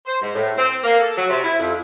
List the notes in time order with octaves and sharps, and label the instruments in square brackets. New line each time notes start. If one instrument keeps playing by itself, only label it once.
[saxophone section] C5
G#2
A2
C4
A#3
A4
F#3
C3
E4
F2